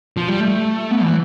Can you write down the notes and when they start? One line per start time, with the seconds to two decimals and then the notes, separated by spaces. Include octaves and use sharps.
0.17 F3
0.28 G3
0.40 A3
0.91 B3
1.03 E3